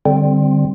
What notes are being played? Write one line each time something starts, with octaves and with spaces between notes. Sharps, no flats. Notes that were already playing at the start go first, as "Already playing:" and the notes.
D3 G3 C4